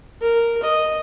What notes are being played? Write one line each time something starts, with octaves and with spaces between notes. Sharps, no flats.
A#4
D#5